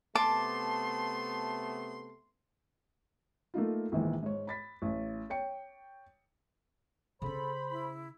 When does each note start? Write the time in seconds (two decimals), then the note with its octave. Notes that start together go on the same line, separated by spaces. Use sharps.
0.15 C3 A3 B3 A5 C6 D6
3.54 A3 A#3 D#4 F4
3.92 A#1 G#2 D#3 E3 A#3
4.23 G#2 C#5
4.47 B5 A6 B6
4.82 A1
5.30 C#5 G5 C#7
7.22 C#3 C#4 A4 C5 B5
7.71 E4